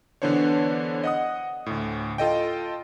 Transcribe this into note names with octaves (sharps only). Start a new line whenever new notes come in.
D3 E3 B3 D4 C5 C#5
D#5 F#5 D#6
D2 A2
F4 A4 D#5 G5